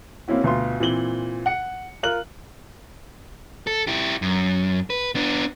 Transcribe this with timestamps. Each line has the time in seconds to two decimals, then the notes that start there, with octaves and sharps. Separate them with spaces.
0.28 A#3 C4 C#4 E4 F#4
0.44 D2 B2 F4 C6
0.80 A#2 E3 C4 F#7 G7
1.46 F#5 C#7
2.03 F4 A#4 F#6 F#7
3.67 A4
3.87 E4 G4
4.22 F#2
4.90 B4
5.15 B3 D4